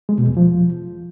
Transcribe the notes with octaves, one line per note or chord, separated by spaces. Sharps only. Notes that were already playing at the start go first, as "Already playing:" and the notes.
G#3
B2
E2
F3